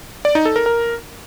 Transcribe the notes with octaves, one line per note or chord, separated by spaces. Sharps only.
D5
D#4
A4
A#4
A#4